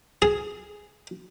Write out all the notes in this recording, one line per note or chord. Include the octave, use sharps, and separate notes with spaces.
G#4